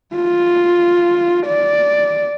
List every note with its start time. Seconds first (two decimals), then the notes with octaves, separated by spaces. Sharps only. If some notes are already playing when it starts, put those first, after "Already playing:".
0.15 F4
1.47 D5